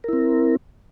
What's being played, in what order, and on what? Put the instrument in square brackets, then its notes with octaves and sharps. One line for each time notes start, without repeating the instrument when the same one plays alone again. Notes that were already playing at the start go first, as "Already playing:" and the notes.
[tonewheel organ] A#4
E4
C4